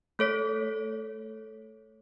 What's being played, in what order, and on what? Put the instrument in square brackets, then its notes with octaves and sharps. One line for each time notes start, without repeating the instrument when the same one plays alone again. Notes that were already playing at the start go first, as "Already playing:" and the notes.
[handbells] A3 A4 C#5 B6